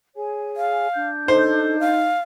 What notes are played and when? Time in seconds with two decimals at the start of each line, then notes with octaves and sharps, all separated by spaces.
0.17 G#4 C#5 G#5
0.57 F5
0.94 D4 G6
1.28 D#4 A4 C5
1.80 F5